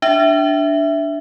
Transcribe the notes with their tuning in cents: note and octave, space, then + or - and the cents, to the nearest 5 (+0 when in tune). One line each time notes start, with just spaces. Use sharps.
D4 +0 E5 +0